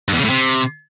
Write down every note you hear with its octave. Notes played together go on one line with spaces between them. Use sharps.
G2
E2
C#3
A2
C3